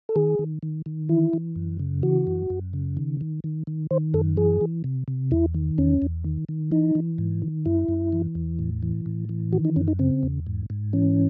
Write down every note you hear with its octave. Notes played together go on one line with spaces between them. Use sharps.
A4
D#3 G#4
D#3
D#3
D#3
E3 E4
E3
F#2
C#3
E3 F#4
F#2
F#2
C#3
D#3
D#3
D#3
D#3
D#3 C5
F#2 A4
E3 G#4
E3
C3
C3
E2 E4
D#3
E2 C#4
E2
D#3
D#3
E3 D#4
E3
G#2
D#3
F#2 E4
F#2
E3
E2
A2
E3
A2
E3
D#3 F#4
D#4
F#2 C#4
D#4
C#3 C4
E2
G#2
G#2
E3 C#4